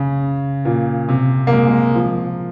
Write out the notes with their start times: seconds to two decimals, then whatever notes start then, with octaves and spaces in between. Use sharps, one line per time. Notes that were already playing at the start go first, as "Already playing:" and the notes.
Already playing: C#3
0.65 A#2
1.09 C3
1.47 A#3
1.53 G#3
1.67 G#3
1.95 F3